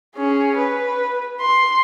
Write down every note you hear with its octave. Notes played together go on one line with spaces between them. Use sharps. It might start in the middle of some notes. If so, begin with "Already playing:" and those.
C#4 G#4
B4
C6